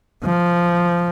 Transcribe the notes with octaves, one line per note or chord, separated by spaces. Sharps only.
F3